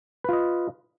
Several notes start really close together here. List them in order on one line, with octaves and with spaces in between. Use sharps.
B4 F4 D#5